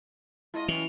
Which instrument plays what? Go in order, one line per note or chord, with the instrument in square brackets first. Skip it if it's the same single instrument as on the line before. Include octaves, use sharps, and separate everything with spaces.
[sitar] G#3 F4 D#5 [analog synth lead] E4
[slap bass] E3 [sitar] F#3 C#4 [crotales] F7